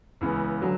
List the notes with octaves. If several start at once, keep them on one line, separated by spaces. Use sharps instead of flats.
C#2 C#3 E3 B3
D3 F#3